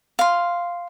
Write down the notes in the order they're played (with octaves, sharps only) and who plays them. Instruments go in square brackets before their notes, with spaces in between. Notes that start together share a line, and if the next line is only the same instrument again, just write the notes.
[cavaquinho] F5 C6